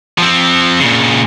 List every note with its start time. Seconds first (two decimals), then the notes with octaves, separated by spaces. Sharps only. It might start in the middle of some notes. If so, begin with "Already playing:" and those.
0.18 F3 C4
0.80 A#2 C#3